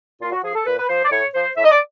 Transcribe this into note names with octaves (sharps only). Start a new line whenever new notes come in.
A#2 F4
F#4
F3 G#4
A4
A#2 B4
B4
F3 C5
D5
A2 C#5
F3 C5
A2 E5
D#5
D5